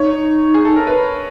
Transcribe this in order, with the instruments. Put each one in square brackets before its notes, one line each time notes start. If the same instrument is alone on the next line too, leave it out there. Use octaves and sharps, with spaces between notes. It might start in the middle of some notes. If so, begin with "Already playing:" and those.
Already playing: [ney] D#4 [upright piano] C#5
[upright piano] G#4
A4
A#4
B4